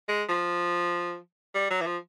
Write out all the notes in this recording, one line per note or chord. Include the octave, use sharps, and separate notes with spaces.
G#3
F3
G3
F#3
E3
F3